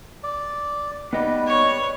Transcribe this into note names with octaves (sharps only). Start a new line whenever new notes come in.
D5
G3 B3 D#4 B4 D#5
C#5